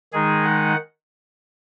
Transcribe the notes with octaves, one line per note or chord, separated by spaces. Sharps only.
D#3 G#3 D#4 G#4
F#5